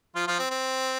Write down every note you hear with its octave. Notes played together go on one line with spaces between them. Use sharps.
F3 F4
F3 F4
C4
C4